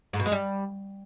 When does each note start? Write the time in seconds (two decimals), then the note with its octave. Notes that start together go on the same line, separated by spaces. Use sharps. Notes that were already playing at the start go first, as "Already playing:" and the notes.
0.13 G#2
0.20 B2
0.26 G#3
0.32 G3